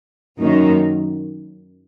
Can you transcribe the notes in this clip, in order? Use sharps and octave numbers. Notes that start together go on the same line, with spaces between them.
F#2 D#3 F#3 A#3 D#4